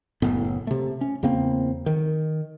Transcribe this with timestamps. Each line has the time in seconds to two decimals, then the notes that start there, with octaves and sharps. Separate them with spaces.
0.22 F#1 A2 B3
0.67 C3 A3
1.01 C#4
1.23 E2 C#3 A#3 C4
1.86 D#3